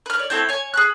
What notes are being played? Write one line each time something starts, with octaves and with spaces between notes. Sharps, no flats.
B4 F6
C#5 D5
A3 C4 E4 G5
C#5 G#5
G#4 B5 F#6